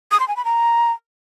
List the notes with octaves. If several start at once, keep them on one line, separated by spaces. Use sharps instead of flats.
D#6
C6
G#5
B5
A#5